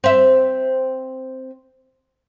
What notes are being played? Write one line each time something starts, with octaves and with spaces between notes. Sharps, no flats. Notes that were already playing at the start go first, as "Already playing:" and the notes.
C4 E5